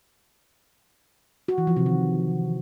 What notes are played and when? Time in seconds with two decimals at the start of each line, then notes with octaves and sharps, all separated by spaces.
1.48 F#4
1.58 E3
1.67 F3
1.77 C3
1.86 D#3